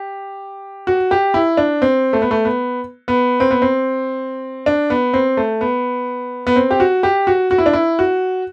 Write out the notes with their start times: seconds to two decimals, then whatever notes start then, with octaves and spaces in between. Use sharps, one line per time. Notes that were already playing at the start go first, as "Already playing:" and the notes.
Already playing: G4
0.87 F#4
1.11 G4
1.34 E4
1.57 D4
1.82 C4
2.13 A3
2.22 B3
2.31 A3
2.45 B3
3.08 B3
3.40 C4
3.51 B3
3.62 C4
4.66 D4
4.90 B3
5.14 C4
5.37 A3
5.61 B3
6.47 B3
6.56 C4
6.71 G4
6.80 F#4
7.03 G4
7.27 F#4
7.51 F#4
7.58 E4
7.66 D4
7.73 E4
7.99 F#4